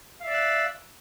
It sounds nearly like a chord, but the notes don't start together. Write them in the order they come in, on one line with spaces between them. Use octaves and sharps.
F5 E5 D5 E6 F#6